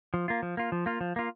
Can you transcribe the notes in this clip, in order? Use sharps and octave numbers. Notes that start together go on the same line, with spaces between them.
F3
A#3 F4
F3
A#3 F4
F3
A#3 F4
F3
A#3 F4